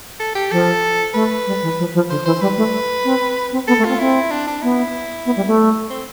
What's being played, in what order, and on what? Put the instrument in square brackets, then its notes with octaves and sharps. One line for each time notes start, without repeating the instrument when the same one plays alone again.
[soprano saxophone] A4
G4
[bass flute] F3 [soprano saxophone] A4
[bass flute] A3 [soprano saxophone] B4
[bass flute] G3
E3
F3
F3
[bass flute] D3 [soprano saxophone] C5
[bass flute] E3 [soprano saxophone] C5
[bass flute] G3 [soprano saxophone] B4
[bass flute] A3
C4
C4
[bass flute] B3 [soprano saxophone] A4
[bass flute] A3
[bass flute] C4 [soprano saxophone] F4
[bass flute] C4 [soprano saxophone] E4
[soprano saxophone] D4
D4
[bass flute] B3 [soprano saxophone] E4
[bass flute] B3
G3
A3
[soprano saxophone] C4